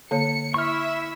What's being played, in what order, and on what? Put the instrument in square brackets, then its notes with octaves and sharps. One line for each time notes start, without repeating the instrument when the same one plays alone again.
[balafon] D3 A#3 C#5 [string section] C#7
[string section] E4 E5 [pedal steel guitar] C#6 F6